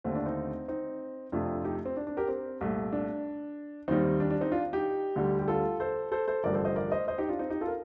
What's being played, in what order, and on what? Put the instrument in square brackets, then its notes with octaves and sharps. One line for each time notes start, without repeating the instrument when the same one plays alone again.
[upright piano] D#2 D3 A3 C4
D4
C4 D#4
C4 D#4
F2 C3 F3 A3 D4 F4
D#4 G4
C4
D4
D4
G4 A#4
C4
C2 A#2 A3
D4
D#2 D#3 G3 C4 D#4
D4
D4
C4 D#4
D4 F4
D#4 G4
D2 D3 G3
G4
F4 A4
A4 C5
A4 C5
A4 C5
A1 G2 D3 F3 A#4 D5
A4 C5
C5 D#5
A#4 D5
C5 D#5
C5 D#5
D#4 G4
D4 F4
C4 D#4
D#4 G4
F4 A4
A#4